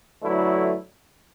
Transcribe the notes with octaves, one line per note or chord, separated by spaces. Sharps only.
D3 F#3 A3 E4 B4